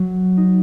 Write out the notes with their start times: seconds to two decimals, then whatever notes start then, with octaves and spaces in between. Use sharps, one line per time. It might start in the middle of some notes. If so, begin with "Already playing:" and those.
Already playing: F#3
0.37 D#4